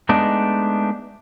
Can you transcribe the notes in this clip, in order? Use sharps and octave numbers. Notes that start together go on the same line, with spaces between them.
G#3 A3 B3 D4 D#4